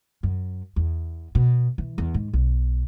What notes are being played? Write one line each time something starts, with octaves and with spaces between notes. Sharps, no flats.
F#2
E2
B2
E3
E2
G#2
B1